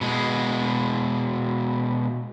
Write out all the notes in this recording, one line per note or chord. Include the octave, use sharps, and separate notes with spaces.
B2 G#3